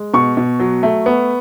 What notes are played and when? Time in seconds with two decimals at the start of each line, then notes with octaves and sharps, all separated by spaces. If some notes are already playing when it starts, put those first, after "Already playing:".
Already playing: G#3
0.14 B2 C#6
0.37 B2
0.59 F#3
0.83 A3
1.06 B3